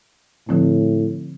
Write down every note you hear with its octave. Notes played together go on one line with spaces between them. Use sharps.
A2 D3 F3 C4